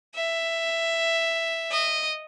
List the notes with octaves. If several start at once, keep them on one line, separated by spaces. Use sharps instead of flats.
E5
D#5